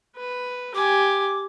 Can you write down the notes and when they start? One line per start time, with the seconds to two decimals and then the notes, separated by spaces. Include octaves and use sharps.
0.17 B4
0.75 G4 G#5 D6